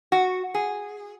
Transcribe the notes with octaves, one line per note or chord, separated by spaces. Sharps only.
F#4
G#4